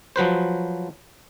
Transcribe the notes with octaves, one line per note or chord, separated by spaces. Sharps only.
F3 F#3 B4 C5